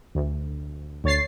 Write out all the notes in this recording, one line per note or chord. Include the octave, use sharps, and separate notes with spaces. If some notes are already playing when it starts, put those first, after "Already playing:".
D2
D2 C#5 A6 C7